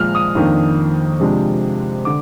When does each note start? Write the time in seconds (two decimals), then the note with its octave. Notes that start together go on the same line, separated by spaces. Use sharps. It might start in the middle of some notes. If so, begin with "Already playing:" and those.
Already playing: A#2 F3 G#3 F6
0.15 D#6
0.35 F2 D#3 A#3 D4
1.20 C3 F3 G#3 D4
2.05 D3 D6